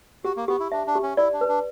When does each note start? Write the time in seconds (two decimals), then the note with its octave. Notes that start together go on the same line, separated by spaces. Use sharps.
0.24 F#4 G4
0.37 A#3
0.48 B3 G4
0.60 E4
0.72 D4 E5
0.87 D4
0.95 G4
1.03 C#4
1.17 E4 D5
1.33 D4
1.41 B4
1.48 D4